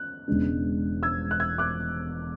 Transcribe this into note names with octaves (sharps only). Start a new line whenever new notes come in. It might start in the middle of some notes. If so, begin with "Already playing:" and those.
Already playing: F#6
E1 E2 C#3 G#3 D4
E6 G#6
F#6
E6 G#6
D6 F#6